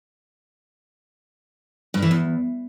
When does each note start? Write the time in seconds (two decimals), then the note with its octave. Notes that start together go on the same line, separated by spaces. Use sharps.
1.94 G2
2.02 E3
2.11 E2